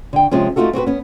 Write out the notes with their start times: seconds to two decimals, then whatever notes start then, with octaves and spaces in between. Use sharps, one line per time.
0.13 D3 G5
0.31 C3 F3 G#3 C#4
0.56 A3 A#3 D#4 F4 F#4 A4
0.73 C4 F#4 G#4 B4
0.87 B3 C#4